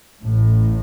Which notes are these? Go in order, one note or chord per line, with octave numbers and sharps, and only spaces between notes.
A1 A2